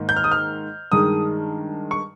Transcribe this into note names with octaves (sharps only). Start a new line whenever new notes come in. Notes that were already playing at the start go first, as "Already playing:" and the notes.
Already playing: G#2 D#3 A#3
G6
F6
D#6
F6
G2 D#3 G#3 D#6
C#6